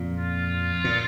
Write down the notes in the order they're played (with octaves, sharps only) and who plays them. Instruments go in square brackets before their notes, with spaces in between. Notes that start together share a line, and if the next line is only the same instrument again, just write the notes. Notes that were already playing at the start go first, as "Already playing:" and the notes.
Already playing: [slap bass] F2 A#2
[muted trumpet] F4
[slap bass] A#2